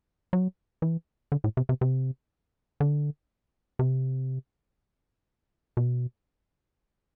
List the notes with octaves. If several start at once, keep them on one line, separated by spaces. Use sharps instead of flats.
F#3
E3
D3
A2
C3
C3
C3
D3
C3
B2